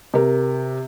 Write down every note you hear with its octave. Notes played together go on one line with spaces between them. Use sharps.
C3 A#4